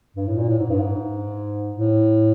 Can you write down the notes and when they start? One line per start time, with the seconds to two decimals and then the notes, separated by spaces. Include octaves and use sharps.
0.17 G2
0.27 A2
0.38 A#2
0.48 A2
0.59 G#2
0.70 G2
0.80 G#2
1.76 A2